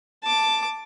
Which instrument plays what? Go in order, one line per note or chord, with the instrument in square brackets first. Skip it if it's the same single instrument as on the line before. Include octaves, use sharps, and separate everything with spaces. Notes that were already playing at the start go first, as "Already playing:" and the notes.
[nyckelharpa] A5 D6